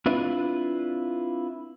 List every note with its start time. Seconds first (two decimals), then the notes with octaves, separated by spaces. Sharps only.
0.06 C4 D4 E4 F4 B4